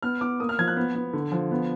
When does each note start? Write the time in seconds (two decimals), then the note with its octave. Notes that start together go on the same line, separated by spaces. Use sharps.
0.03 B3 F6
0.21 B3 D6
0.40 A#3 D#6
0.49 F6
0.58 F3 G#6
0.68 F#6
0.77 B3
0.95 B3
1.13 D3
1.32 F3
1.51 B3